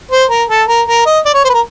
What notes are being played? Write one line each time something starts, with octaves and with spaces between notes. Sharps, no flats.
C5
A#4
A4
A#4
A#4
D#5
D5
C#5
C5
B4
A#4